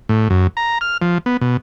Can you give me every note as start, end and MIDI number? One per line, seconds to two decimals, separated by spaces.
0.09 0.28 45
0.30 0.47 42
0.57 0.78 82
0.81 0.97 89
1.02 1.18 53
1.26 1.37 59
1.41 1.57 47